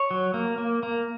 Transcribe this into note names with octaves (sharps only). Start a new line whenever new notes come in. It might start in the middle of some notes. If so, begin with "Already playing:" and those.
Already playing: C#5
F#3
A#3
A#3
A#3